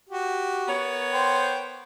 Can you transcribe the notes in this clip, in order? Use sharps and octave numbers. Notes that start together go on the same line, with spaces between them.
F#4 G4
B3 A#4 C#5
C5 G5